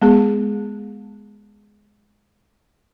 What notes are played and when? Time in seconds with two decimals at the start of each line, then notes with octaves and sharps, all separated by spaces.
0.02 G#3 B3 G#4